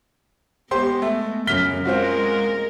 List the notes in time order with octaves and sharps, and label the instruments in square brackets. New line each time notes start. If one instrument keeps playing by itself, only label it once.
[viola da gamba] G#3 B3 [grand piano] G4 C5 C6
[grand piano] A3
[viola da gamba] F#2 C#3 [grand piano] F6 B6 G7
[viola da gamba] G#3 A#4 [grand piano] C4 F4 F#4